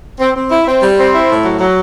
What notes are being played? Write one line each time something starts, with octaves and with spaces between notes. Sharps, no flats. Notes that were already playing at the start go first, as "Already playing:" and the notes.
C4
C4
E4
C4
G3
C4
E4
A2
F#3
F#3